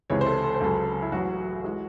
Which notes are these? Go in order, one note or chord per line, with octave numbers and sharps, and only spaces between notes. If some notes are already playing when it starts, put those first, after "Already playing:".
C#2 C3 E3 G#3 C#5
C5
A4
A4
C5
C#2 C#3 F#3 A4
E4
A1 A2 F#3 F#4
E3 G#3